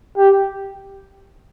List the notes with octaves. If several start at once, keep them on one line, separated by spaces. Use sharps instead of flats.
G4